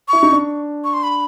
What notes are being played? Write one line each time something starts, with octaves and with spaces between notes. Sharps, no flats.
E4 C#6
D#4
D4
C#6
C6
B5